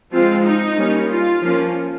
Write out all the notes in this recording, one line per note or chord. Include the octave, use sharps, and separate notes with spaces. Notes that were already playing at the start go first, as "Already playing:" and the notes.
F3 G#3 C4 F4
D#4
G3 A#3 C#4
F4
F3 A#3 C#4